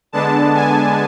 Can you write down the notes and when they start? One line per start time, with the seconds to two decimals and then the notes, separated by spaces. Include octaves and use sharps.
0.12 D3 G#3 B3 D4 A5
0.55 G#5